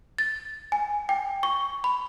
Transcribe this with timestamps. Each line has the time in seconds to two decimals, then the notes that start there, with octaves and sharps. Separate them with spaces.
0.18 A6
0.72 G#5
1.09 G5
1.43 C#6
1.84 B5